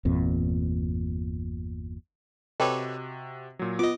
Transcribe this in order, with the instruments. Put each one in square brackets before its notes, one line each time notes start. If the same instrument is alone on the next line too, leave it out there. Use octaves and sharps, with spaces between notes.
[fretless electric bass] G1 E2 A#2 C4
[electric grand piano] C3 F#4 [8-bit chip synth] A4 B4 C#5 [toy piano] D#5 G5 D6
[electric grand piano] A#2 F#3
[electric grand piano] B3 [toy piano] F4 [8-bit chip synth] D#5 D6